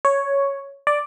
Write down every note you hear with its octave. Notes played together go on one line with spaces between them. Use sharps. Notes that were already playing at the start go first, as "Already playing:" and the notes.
C#5
D5